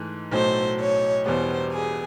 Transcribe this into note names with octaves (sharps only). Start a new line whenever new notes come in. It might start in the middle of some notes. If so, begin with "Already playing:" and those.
Already playing: G#2 E3 A3
B1 A2 F#3 A3 C5
C#5
E1 E2 B2 G3 B3 C5
G#4